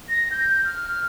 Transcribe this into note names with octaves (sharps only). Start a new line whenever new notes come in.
A#6
G6
F6